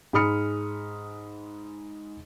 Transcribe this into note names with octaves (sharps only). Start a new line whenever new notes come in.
G#2 G#3 B5 D#6 F6 C#7